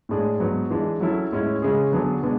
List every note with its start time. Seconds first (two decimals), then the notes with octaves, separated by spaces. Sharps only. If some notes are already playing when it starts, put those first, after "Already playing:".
0.09 A2 G#3 D4 G#4 D5
0.40 G#2 F#3 B3
0.70 E3 G#3 D4
1.00 F#3 C#4 E4 A4
1.32 A2 G#3 C#4 E4
1.62 C#3 G#3 C#4 G#4
1.92 D3 F#3 B3 D4 G#4
2.23 B2 G#3 B3 D4